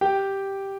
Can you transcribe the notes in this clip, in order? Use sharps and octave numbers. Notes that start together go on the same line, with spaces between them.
G4 G5